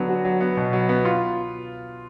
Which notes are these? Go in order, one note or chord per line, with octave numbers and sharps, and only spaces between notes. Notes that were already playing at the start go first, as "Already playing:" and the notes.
Already playing: D3 F#3 B3
F#4
F#3
B3
B2
F#3
B3
F4